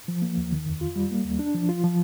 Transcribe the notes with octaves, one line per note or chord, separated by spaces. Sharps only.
F3
A#3
D#2
D#3
F2
F4
G3
A#3
D#2
D4
F3
F4
F3